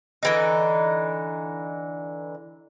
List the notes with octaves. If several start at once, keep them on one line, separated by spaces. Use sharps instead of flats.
D3 E3 D#4